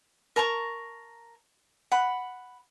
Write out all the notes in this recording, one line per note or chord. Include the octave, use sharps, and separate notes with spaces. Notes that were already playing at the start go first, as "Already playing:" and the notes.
A#4 A5 A#5 C#6
F#5 B5